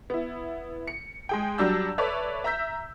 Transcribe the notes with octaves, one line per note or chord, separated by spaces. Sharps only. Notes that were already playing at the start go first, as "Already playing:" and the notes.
B3 E4
C#7
G#3 G#4 G5
F#3 G3 D4 A5 E6 G6
A4 B4 C#5 D5 E5
E5 A#5 E6 G6 B6